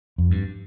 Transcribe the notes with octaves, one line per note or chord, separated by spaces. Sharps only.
F2
G2